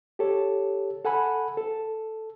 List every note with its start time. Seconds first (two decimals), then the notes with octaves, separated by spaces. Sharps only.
0.19 G4 A4 C#5
1.05 A4 F#5 G#5 B5
1.57 A4